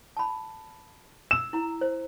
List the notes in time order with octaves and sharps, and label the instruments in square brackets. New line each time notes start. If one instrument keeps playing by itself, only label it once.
[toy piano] A5 B5
[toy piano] E6 [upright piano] E7
[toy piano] E4 A#5
C5